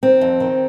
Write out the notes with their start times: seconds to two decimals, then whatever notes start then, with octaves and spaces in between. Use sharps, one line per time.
0.03 D#3 C4
0.21 F2
0.40 D#3